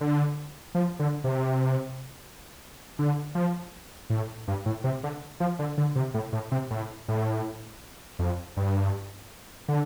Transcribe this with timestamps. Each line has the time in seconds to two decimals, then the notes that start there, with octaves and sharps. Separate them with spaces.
0.01 D3
0.75 F3
0.99 D3
1.24 C3
2.99 D3
3.35 F3
4.10 A2
4.48 G2
4.66 A2
4.84 C3
5.04 D3
5.40 F3
5.59 D3
5.78 D3
5.96 C3
6.14 A2
6.33 A2
6.52 C3
6.71 A2
7.08 A2
8.19 F2
8.57 G2
9.68 D3